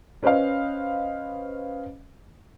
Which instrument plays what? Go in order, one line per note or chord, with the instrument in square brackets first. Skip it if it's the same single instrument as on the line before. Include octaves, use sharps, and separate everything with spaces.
[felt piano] C#4 B4 C5 D#5 F5